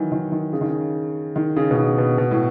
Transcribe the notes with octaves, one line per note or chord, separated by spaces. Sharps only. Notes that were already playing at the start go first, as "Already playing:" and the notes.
Already playing: D#3 E3 F#3
D#3
D#3
C#3
D#3
C#3
D#3
C#3
B2
C#3
B2
B2
A2